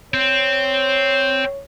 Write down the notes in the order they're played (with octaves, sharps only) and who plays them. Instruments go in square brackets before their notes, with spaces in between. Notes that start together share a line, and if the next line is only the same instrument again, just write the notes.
[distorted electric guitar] C4 [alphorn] C#5